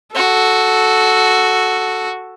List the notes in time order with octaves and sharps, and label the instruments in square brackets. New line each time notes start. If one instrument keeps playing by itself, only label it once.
[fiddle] F#4 [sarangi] A4